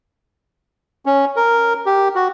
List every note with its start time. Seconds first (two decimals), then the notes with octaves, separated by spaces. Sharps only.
1.06 C#4
1.36 A#4
1.86 G4
2.15 F#4